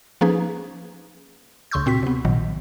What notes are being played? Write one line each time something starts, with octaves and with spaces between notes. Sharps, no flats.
F3 A#3 C#4 D#4 G#4 B4
D2 C#3 C6 C#6 E6 G6
A#2 C4 F#4 B6
C3 B3
A#1 A#2 D#3 F#3